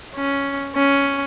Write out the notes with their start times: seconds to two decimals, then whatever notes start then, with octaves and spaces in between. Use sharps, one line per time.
0.16 C#4
0.75 C#4